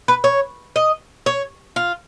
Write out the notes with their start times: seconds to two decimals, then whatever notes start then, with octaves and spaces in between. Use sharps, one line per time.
0.08 B4
0.24 C#5
0.76 D#5
1.26 C#5
1.76 F4